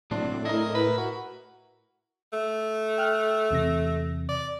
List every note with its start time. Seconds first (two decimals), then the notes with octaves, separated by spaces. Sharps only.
0.11 A2 F#3 C4 D4
0.28 A2
0.45 E4 A#4 D#5
0.75 B4
0.98 F#4
2.33 A3
2.98 G5 F6 F#6
3.51 E2 C3 A#6
4.29 D5